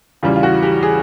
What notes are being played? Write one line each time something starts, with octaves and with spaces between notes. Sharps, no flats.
E2 C#3 E3 G3 F4
F4
F#4
G4
G#4